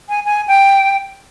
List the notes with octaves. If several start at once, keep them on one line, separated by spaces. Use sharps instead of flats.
G#5
G#5
G5